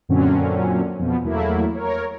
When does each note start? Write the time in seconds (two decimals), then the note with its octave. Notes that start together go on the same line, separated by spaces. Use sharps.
0.09 F#2 A#2 D3 F#3 C4 C#4
0.99 F2 B2 B3
1.24 E2 F#3 A3 A#3 E4
1.75 A#4 C#5